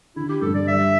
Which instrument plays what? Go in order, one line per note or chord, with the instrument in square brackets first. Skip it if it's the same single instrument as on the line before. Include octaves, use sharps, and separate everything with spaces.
[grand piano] D3 [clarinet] E4
[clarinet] G4
[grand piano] G2 [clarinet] A4
[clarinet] D5
[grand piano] G3 [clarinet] E5